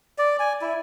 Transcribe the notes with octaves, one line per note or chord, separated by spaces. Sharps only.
D5
G#5
E4